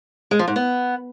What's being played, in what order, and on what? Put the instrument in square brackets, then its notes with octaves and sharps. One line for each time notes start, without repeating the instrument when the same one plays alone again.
[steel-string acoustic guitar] G#3
F3
G#2
B3